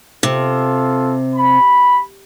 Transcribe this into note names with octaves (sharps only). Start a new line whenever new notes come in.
C3 F4 A4
B5